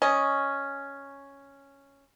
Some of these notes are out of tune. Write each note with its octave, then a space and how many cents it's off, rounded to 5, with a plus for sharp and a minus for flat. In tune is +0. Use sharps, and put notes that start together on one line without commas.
C#4 +0 D#5 +0